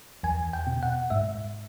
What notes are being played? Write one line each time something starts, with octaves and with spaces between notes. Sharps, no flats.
E2 G#5
G5
B2
F#5
G#2 E5